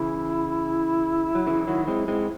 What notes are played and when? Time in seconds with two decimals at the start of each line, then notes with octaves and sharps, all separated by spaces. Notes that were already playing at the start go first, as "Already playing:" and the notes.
Already playing: C#3 E3 E4
1.35 F#3
1.47 C#3 E3
1.67 D#3 F#3
1.88 G#3 C4
2.08 G#3 C4